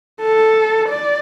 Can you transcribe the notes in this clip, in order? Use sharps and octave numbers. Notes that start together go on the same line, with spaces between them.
A4
D5